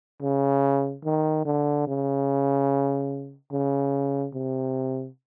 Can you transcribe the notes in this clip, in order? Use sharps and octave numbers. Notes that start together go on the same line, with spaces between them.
C#3
D#3
D3
C#3
C#3
C3